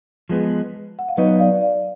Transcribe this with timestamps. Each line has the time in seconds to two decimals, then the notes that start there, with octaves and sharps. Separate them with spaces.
0.29 F3 G#3 B3
0.99 F#5
1.09 F5
1.17 F#3 B3 D#4 B4 D#5
1.40 D5 F5
1.62 D5 F5